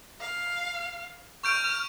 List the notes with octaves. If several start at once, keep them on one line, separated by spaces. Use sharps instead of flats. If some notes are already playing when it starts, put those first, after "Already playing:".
F5
C#6 F6 G6 D7